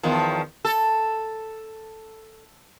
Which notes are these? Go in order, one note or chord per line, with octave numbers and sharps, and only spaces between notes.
E2 D#3 F3
A4